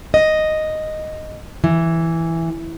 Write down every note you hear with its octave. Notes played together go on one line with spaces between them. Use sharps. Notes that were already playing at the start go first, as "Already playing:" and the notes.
D#5
E3